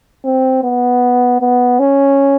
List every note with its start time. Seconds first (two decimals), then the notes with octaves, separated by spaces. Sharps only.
0.25 C4
0.63 B3
1.41 B3
1.79 C#4